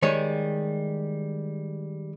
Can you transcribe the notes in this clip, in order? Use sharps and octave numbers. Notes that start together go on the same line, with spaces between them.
D#3 G3 G#3 C#5